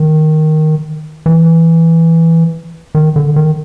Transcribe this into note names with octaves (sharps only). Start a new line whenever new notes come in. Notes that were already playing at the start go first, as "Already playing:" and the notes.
Already playing: D#3
E3
D#3
D3
D#3